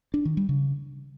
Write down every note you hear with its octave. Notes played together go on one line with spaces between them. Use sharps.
D4
D#3
G3
C#3